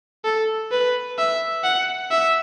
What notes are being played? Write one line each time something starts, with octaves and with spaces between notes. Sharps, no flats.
A4
B4
E5
F#5
E5